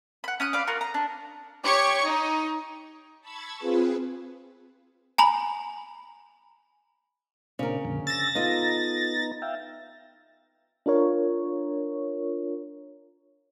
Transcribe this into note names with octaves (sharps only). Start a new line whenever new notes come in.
F#5 B5
C#4 D#6 F#6
B4 D5 F5 D6
F4 F#4 A#4
A#5
D4
G4 C#5 C#6 G#6 C#7
D#4
A5 B5 C#6 E6 G#6 A6
C4 F4 G#4 B4
G#5 A#5 B5 F#7
A#2 C#3 C4 D4 A#4
F2 A#2 D3
E6 A6 A#6
B3 D#4 F4 A4 D#5 A#5
E5 F5 G5
D4 F4 A#4 C#5